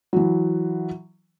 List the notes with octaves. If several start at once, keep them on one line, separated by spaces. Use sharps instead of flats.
E3 F#3